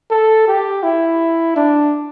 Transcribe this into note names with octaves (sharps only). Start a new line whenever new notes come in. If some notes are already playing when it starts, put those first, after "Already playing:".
A4
G4
E4
D4